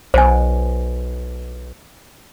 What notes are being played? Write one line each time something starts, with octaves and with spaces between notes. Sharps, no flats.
B1 C5 G#5